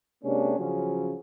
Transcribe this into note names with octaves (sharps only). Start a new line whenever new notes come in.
C3 G#3 A#3 C#4 D4
C#3 F3 F#3 C#4